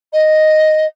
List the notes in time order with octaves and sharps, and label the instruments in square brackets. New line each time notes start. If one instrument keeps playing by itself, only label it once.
[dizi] D#5